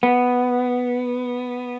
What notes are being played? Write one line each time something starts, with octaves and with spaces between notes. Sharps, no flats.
B3